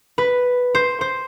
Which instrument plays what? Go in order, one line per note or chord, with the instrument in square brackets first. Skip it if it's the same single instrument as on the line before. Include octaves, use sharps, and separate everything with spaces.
[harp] B4
C5
C5